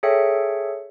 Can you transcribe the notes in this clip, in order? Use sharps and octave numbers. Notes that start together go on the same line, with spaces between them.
G#4 A4 C#5 E5 G5 C#7